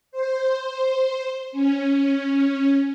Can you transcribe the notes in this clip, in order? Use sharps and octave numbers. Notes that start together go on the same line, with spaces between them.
C5
C#4